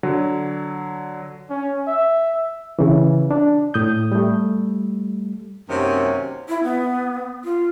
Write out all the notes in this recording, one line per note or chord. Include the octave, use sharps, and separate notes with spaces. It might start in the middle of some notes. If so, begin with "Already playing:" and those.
D3 F#3
C#4
E5
C#3 E3
D4
A2 D#6 G6
G3 A3
F#2 C3 D#3 A#3 C#4 C#5
E4
B3
F4